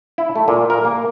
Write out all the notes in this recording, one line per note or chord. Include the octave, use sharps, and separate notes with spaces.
E4
A3
A#2
A#4
A#3